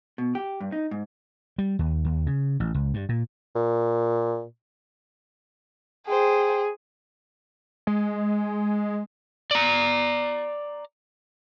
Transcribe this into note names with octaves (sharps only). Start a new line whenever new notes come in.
B2
G4
G2
D#4
G#2
G3
D#2
D#2
C#3
A1
C#2
G2
A#2
A#2
G#4 C5 G5
G#3
D5 A#5